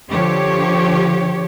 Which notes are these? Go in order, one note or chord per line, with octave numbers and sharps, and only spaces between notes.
D3 F3 G4 C#5